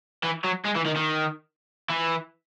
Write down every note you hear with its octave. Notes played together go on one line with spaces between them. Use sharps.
E3
F#3
G#3
E3
D#3
D#3
E3